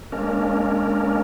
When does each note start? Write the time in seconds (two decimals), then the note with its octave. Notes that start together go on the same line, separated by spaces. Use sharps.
0.12 G#3 A#3 C#4 D4 A#4